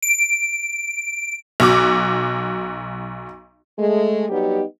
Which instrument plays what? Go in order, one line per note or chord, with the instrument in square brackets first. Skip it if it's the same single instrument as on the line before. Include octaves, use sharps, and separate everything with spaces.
[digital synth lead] D7
[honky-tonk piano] B1 F#4 D6
[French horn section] G#3 A3
F#3 G3 B3 D#4 G4